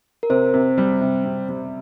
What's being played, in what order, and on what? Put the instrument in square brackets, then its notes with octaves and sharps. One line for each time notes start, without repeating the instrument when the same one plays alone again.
[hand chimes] A#4
[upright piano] C3 [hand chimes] C5
[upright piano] C3
G3
C3
C3
G3